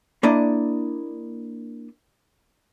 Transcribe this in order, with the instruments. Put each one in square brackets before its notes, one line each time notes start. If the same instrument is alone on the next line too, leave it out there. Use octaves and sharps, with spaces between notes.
[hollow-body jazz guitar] A#3 D4 E4 D5 D#5